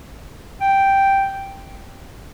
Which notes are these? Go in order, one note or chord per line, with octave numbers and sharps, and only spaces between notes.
G5